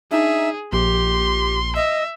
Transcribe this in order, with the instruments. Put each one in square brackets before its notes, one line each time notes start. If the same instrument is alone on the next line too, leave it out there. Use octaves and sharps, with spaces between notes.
[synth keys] D4 D#4 [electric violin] G#4 [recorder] E5
[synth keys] A#1 [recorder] G4 [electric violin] C6
[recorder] D#5 [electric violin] E5